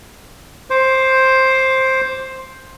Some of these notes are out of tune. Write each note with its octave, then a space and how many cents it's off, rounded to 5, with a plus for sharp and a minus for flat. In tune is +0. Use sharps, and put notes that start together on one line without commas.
C5 +10 D6 -20